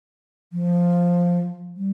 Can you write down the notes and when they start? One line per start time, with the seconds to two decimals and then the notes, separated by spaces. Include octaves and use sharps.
0.53 F3
1.76 G3